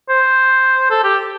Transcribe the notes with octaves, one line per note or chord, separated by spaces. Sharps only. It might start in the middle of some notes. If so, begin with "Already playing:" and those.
C5
A4
G4